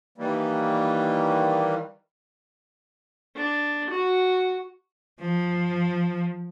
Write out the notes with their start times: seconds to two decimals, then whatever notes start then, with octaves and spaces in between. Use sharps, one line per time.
0.18 D#3 E3 G3 A#3
3.36 D4
3.90 F#4
5.20 F3